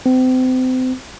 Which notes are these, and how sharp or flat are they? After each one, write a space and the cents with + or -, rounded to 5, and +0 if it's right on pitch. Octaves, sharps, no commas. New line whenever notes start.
C4 -35